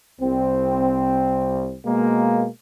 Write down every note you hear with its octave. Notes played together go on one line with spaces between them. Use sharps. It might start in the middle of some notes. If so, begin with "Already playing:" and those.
C2 C4
B2 G#3 A#3